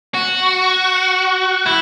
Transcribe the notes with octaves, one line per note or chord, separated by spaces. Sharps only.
F#4
E4